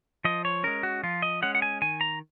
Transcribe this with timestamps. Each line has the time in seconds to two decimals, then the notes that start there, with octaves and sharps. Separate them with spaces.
0.25 F3 D#5
0.45 C#5
0.64 G#3 C#4 A#4
0.83 F#4
1.03 F3 F4
1.22 D#5
1.42 G#3 C#4 F#5
1.55 F#5
1.62 G#5
1.82 D#3 G#5
2.01 A#5